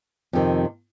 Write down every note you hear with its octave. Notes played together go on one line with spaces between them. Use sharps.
F2 C3 D#3